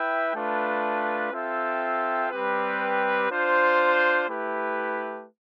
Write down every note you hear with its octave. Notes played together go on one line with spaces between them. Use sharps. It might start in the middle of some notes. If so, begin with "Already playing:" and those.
Already playing: E4 B4 E5 G5
A3 D4 F4 B4
C4 F4 A4 E5 G5
G3 C4 G4 B4
D4 F4 C5
A3 E4 G4 B4